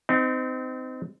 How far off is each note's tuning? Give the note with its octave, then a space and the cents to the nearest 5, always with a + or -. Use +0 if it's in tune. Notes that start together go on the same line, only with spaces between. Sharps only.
C4 -30 D#4 +0